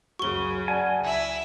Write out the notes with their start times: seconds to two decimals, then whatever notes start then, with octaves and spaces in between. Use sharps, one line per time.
0.19 C#2 F#2 C#3 F#4 C#6 G7
0.68 D5 F#5 G#5 A5
1.02 C#2 E4 E5